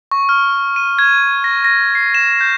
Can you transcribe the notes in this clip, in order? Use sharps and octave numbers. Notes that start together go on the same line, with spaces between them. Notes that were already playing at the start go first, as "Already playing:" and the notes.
C#6
F6
D#7
G#6
A#6
A#6
C7
E7
G6